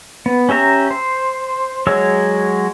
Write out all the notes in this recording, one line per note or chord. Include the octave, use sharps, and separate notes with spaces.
B3
C#4 G4 E5 A#5
C5
F#3 G#3 C#5 E6